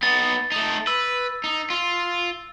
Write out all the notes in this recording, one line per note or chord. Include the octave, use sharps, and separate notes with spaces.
B3 D#4 A6
A3 D#4
B4 E6
D#4
F4